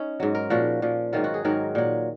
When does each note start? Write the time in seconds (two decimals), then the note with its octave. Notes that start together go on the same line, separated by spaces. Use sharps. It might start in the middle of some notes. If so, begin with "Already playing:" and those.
Already playing: C#4 D#4
0.20 G#2 F#3
0.35 A#4
0.50 A#2 F3 F#4
0.82 A#2 F3
1.13 G#2 D#3 F#3 F4
1.24 F#4
1.34 G#4
1.44 G#2 D#3 F#3 A#4
1.75 A#2 F#3